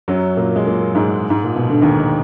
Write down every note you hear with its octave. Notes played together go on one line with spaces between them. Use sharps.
F#2 F#3
A#2 A#3
G#3
A#2 A#3
G#2 G#3
G#2
A#2
B2
D3
D#2 D#3